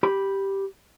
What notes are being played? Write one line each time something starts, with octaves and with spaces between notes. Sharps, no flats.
G4 B5